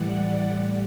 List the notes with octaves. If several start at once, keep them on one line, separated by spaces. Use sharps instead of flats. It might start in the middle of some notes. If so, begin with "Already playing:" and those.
Already playing: A2 E3 G3 D5 F#5
A2 G3